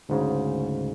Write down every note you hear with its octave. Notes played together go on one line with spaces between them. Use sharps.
D2 G#2 C#3